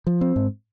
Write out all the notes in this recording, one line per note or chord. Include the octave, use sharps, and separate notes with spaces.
F3
C4
G#2